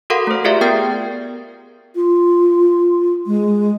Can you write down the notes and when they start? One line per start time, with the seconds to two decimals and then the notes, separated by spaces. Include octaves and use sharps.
0.10 F#4 A4 A#4 F5 F#5 C6
0.27 A3 C5
0.44 F4 G4 G#4 D5 E5 F5
0.61 B3 A#4 G5 G6 A6 C7
1.95 F4
3.26 G#3